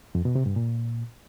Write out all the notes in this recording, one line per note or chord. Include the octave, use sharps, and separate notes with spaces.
F2
B2
C3
G2
A#2